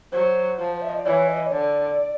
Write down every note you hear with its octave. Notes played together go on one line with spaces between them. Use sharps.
F#3 C5
F3
E5
D#5
D5
E3 C#5
D#5
C#5
D3 D5